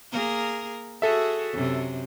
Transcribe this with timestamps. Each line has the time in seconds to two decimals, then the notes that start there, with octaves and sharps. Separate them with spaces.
0.12 A#3 G#4 A#4
1.02 F#4 G#4 A4 E5
1.52 F#2 C3